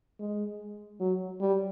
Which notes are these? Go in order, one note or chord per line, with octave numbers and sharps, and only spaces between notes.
G#3
F#3
G3